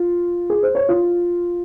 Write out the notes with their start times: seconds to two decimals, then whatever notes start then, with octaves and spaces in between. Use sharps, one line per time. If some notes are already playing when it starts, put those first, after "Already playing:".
Already playing: F4
0.50 G#4
0.63 C5
0.75 C#5
0.89 F4